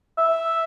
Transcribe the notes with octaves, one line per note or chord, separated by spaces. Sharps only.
E5